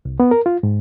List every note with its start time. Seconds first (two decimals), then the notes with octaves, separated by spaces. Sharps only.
0.05 C2
0.20 B3
0.31 A#4
0.46 F4
0.63 G#2